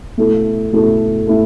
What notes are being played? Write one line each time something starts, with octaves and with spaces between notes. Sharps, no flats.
B2 A3 E4 A4
B2 A3 E4 A4
A3 E4 A4